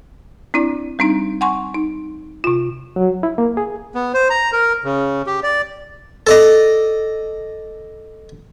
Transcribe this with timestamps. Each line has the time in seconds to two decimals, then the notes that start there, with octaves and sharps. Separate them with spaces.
0.54 C4 D4 E4 D5
0.99 G3 C4 D4 D#4
1.41 F#5 G#5 C6 C#6
1.74 D#4
2.44 C3 F4
2.96 F#3
3.23 E4
3.38 A#3
3.57 G#4
3.95 B3
4.14 C5
4.30 A#5
4.52 A#4
4.84 C#3
5.27 G4
5.43 D5
6.27 A4 D5 D#5